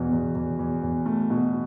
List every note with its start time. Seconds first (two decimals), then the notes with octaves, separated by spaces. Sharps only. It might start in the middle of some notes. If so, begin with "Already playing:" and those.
Already playing: E2 B2
0.13 E2
0.35 E2
0.59 E2
0.83 E2
1.06 A3
1.30 B2